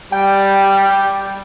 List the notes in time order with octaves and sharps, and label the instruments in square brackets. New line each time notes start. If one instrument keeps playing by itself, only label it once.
[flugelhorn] G3 [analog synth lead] G5